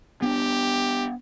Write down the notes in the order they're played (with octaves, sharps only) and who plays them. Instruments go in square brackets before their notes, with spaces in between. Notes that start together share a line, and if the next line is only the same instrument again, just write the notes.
[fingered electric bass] B3 C#4 D4 [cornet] G4